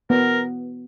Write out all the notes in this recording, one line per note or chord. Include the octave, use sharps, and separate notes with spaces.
B3 A#4